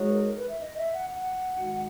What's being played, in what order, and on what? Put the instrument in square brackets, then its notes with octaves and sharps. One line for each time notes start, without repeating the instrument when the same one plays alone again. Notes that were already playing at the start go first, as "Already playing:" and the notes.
Already playing: [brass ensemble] G#3 D#4 F#4 C#5
[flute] B4
A#4
A#4
B4
E5
D#5
E5
F#5
F#5
[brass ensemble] G#2 D#3 G#3 D#4 F#4